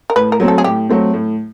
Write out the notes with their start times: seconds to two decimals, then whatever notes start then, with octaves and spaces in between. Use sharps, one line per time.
0.10 A#4
0.16 A2 B4
0.32 A#4
0.40 F#3 A3 C4
0.48 A4
0.58 G#4
0.64 A2 G4
0.89 F#3 A3 C4
1.14 A2